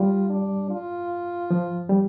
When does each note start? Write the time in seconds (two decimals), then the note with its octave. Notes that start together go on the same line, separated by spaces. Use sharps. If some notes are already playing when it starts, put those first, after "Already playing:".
Already playing: G3 F4
0.30 D4
0.70 F4
1.51 F3
1.89 G3